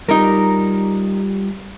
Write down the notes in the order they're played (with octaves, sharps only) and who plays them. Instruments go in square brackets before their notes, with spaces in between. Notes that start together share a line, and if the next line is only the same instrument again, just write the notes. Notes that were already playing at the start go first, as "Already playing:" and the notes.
[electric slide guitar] G3 F4 G4 [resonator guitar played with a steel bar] D#4 A#4